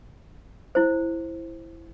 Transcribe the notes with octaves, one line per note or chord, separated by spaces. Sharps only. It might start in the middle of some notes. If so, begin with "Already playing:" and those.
E4 C5